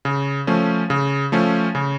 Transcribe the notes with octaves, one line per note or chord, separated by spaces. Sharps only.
C#3
F3 A3 C#4
C#3
F3 A3 C#4
C#3